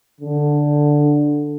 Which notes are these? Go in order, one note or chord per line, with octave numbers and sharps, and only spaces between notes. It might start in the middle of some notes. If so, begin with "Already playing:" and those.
D3